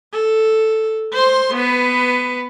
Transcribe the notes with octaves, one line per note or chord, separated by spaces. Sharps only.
A4
C5 C6
B3 B4